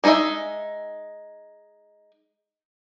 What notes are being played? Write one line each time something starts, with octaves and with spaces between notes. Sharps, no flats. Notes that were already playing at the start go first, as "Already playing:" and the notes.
G#3 D#4 A4 D#5 E5